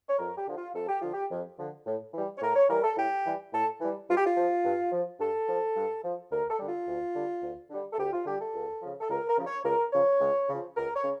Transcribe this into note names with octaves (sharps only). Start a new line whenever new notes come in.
C#5
F2 A#4
G4
D3 F3
F4
F2 A4
G4
D3 F3 F4
G4
F2
D3 F3
A2
E3 G3
C#5
A2 A#4
C#5
E3 G3 A#4
A4
A2 G4
E3 G3
A2 A4
E3 G3
G2 F4
G4
F4
F3
G2
F3
G2 A4
F3
G2
F3
D2 A#4
A4
D3 G3
F4
D2
D3 G3
D2
D3 G3
A4
D2 G4
F4
D3 G3 G4
A4
C#2
C#3 F3
A4
C#2 A#4
A#4
C#3 F3
C#5
C#2 A#4
C#3 F3 C#5
C#2
C#3 F3
C#2 A#4
C#5
C#3